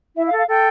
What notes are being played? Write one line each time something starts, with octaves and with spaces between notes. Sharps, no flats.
E4 E5
F5
A4
F5
A4 G5